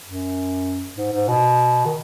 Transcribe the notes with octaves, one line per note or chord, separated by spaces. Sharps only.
F#2
G#2
G#2
B2
D#3